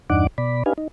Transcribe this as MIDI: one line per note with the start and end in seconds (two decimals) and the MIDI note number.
0.10 0.27 40
0.10 0.27 43
0.10 0.27 62
0.10 0.27 63
0.10 0.27 78
0.10 0.27 86
0.38 0.63 47
0.38 0.63 74
0.38 0.63 83
0.66 0.73 62
0.66 0.73 63
0.66 0.73 67
0.66 0.73 71
0.66 0.73 77
0.66 0.73 80
0.78 0.88 63